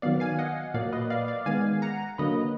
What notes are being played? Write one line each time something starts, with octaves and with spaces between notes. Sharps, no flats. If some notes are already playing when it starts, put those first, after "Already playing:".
D#3 F#3 B3 D5 F5
F5 G#5
D#5 F#5
A#2 F#3 A#3 D5 F5
B4 D#5
D5 F5
D5 F5
D#3 G#3 B3 F5 G#5
F#5 A#5
D3 F#3 A#3 B4 D#5